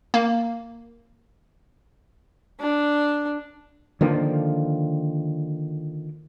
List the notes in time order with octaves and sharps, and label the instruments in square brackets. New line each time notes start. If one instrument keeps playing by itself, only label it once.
[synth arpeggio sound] A#3
[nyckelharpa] D4
[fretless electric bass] D3 D#3 F3 A#3